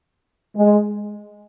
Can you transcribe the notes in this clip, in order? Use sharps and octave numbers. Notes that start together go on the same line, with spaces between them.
G#3